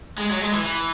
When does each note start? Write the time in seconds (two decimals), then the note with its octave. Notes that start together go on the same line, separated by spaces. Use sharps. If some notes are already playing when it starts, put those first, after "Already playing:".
0.18 G#3
0.30 F#3
0.41 G#3
0.52 E3
0.64 E3